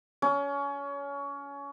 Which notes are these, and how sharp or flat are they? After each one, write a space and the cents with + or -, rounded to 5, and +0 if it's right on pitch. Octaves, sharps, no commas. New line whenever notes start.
C#4 +25